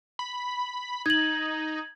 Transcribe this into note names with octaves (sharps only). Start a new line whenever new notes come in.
B5
D#4 G#6 F#7